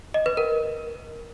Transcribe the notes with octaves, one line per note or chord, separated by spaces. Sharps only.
D#5
B4
A#4